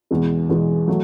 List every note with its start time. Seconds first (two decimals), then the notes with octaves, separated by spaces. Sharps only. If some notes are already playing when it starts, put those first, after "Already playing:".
0.11 E2 B2 G#3
0.49 E2 B2 G#3
0.88 F#3 A3